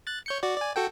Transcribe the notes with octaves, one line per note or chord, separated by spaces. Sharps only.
F#6 A6
C#5 G6 C#7
F#4 D5
D5 G#5
F#4 A4 G5